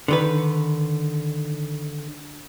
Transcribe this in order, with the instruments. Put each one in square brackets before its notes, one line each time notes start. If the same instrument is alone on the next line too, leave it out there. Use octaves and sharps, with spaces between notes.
[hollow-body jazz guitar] D3 D#3 B4